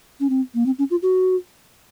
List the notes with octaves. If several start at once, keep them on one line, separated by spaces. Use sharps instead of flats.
C#4
C4
A#3
C4
C#4
F4
F#4